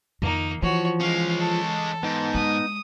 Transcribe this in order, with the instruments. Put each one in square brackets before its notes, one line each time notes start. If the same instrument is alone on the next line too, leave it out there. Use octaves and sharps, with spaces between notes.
[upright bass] F2 D#3 [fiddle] A#3 D#4
[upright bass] E3 [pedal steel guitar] F3 [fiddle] F#4 C#5
[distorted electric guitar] G#3 C#4 [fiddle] F5
[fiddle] A4
[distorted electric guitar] G#2 [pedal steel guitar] B3 D#4
[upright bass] G#3 [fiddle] D#6